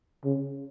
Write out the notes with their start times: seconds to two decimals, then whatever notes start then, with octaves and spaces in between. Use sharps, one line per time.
0.24 C#3